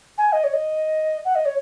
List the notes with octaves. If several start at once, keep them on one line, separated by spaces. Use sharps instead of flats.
G#5
D#5
C#5
D#5
F#5
D#5
C#5